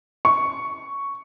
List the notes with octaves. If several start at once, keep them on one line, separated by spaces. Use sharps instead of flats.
C#6